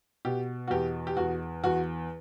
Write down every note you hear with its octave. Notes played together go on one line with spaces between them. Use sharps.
B2 G4
F#4
E2 G4
G4
E2 F#4
E2 F#4